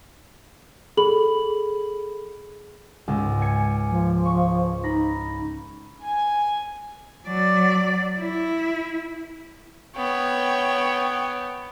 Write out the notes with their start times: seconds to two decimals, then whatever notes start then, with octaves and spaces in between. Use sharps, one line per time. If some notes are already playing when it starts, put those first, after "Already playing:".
0.97 G#4 A4 B5 F#7
3.08 C#2 G#2
3.41 G#5 C#7
3.90 F3
4.25 C#6
4.84 D#4 B5 A#6
6.01 G#5
7.27 F#3 D5
8.19 E4
9.96 B3 C#5 G5